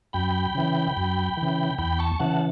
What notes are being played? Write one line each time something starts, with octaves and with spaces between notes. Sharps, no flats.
F#2 G5 B5
C#3 E3
F#2
C#3 E3
E2 G5 B5
A5 C#6
C#3 E3 F#5 A5